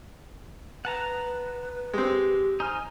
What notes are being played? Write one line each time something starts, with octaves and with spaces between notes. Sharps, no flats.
B4 F#5 A5 A#5
G#3 C4 G4
D#4 C5 G#5 F6